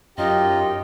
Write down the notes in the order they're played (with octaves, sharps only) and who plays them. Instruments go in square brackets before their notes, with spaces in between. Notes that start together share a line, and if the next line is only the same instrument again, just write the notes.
[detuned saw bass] F#2 [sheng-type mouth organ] D#4 F4 [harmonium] G4 G5 [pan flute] D#5